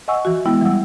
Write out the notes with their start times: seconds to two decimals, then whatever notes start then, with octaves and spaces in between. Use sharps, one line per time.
0.08 D#5 F#5 G#5 C#6 E6
0.25 E3 F#4
0.45 G#3 B3 E4 G5
0.61 E3 G3 F#5 E6